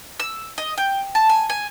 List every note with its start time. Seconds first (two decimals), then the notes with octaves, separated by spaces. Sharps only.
0.20 E6
0.58 D#5
0.78 G5
1.15 A5
1.29 G#5
1.50 G#5